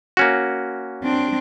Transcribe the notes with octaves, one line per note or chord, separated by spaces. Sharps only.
A#3 C#4 F#4
C4 D4